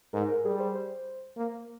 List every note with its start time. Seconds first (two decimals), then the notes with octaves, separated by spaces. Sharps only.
0.13 G#2 A#4
0.29 A#4
0.45 G3 G#4
0.60 C5
0.76 C5
1.37 A#3